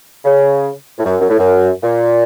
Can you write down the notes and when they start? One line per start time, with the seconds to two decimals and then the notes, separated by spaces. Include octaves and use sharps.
0.25 C#3
0.99 A2
1.04 F#2
1.20 F#2
1.29 A2
1.38 F#2
1.83 A#2